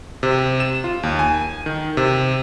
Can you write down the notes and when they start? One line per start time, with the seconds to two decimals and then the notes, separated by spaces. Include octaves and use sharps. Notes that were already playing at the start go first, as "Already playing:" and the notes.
0.23 C3
0.60 E7
0.84 F4
1.03 D#2
1.19 G#5
1.66 D#3
1.97 C3